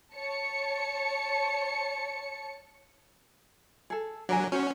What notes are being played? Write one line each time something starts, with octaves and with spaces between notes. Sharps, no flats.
C#5 A5 C#7
G#4 A4
F#3 D4 A#4 G#5
C#4 F#4 C5